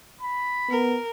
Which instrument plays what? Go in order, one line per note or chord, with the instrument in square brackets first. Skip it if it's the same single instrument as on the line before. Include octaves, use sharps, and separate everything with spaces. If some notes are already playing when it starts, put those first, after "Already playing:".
[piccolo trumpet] B5
[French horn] B3 [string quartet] A#4